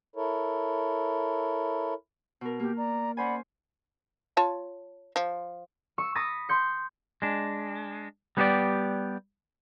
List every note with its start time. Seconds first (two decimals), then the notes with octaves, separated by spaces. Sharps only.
0.16 E4 A4 A#4 C#5
2.41 B2 A#4
2.60 A#3 G4
2.76 D5 A#5
3.17 C#4 C5 D5 F#5 G#5 B5
4.37 F4 C#5 A5
5.16 F3
5.98 C#6 E6
6.15 B5 C#6 D#6 A6 A#6
6.49 C6 G6 C#7
7.22 G#3 D4
8.37 G3 B3 C#4 F#4 G4 D5